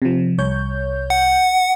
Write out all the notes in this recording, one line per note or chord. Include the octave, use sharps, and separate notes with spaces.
C3 F3
C2 C#5 G6
F#5